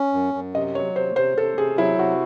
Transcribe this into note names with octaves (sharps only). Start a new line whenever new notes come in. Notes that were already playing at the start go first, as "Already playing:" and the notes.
Already playing: C#4
F#2
F#2
C3 D#5
F#3 C#5
C3 C5
C3 C5
C3 A4
C3 G#4
F#3 E4
C3 F#4